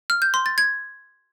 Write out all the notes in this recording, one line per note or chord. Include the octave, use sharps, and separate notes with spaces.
F6
G6
C6
A6
G#6